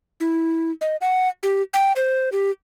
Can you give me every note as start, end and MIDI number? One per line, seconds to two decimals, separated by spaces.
0.20 0.71 64
0.81 0.96 75
1.01 1.28 78
1.43 1.62 67
1.74 1.92 79
1.96 2.29 72
2.32 2.51 67